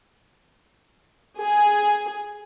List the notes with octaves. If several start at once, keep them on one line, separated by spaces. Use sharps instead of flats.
G#4